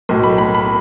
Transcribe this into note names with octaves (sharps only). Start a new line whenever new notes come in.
B1 A2 F#3
B5
B5
B5